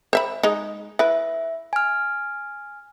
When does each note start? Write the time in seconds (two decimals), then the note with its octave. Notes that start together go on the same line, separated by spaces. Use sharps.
0.13 C5 E5 B5
0.43 G#3 D#4
0.99 E4 B4 E5
1.73 G#5 F6